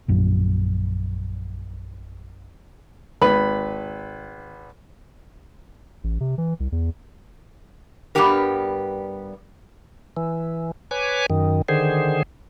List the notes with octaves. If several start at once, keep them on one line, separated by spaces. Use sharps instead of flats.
A#1 F#2
G#1 B4 B5
A1
C3
E3
C2
E2
G2 D#3 G3 B3 G4 A#4
E3
B4 C#5 G#5 D6
F#2 D#3
D3 D#3 G#4 C5